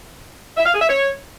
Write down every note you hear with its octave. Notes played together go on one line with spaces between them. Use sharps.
E5
F5
G#4
E5
C#5